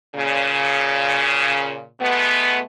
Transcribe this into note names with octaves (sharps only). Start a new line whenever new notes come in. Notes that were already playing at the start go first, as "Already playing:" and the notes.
A#2 C#3
B2 G#3 A3 B3